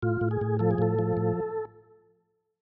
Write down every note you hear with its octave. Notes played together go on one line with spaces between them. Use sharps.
A2 F4
A2
G#4
A2
F3 A4
G#4
A2 A4
F3
A2